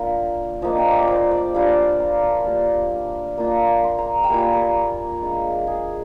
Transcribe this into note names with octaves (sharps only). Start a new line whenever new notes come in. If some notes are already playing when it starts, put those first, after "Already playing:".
Already playing: A#3 D4 F4
F3 A#3 D4 D#5
G5
D5
C5 D5
D5
G3 D4 F4 F5
A#5
C6
C6
G3 A#3 F4 A#5
A#3 D4 F4
C6
A#5
G5
G3 A#3 F4 G#5
A#4
G#3 D4 F4
G#4